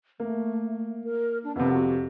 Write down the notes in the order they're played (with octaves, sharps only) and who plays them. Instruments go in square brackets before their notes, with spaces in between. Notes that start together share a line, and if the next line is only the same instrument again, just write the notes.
[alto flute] A3 [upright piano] A#3
[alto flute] A#4
D4
[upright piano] F2 C3 [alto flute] B3
[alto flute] F#4